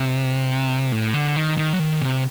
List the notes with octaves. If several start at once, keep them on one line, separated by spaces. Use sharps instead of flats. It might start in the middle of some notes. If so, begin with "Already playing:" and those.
Already playing: C3
A2
D3
D#3
D#3
F#3
D#3
C3